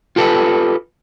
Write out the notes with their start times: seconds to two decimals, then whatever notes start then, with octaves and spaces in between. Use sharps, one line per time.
0.16 F4 G4 A4 B4